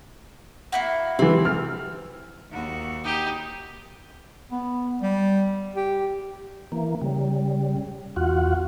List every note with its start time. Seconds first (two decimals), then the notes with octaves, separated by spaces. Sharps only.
0.72 A#3 E4 F#4
1.19 C3 E3 C4
1.45 F6
2.51 D#2 F#4
3.04 D#4 G4
4.51 B3
5.02 G3
5.75 G4
6.72 E3 A#3
7.02 C#3 G3
8.16 E2 F4 F#4 F#5